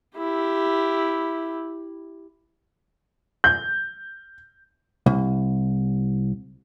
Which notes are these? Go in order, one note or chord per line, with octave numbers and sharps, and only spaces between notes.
E4 G4
G6
C2